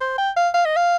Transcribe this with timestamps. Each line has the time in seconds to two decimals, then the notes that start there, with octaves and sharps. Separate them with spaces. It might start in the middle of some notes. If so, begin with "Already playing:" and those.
0.01 C5
0.18 G5
0.37 F5
0.54 F5
0.65 D#5
0.76 F5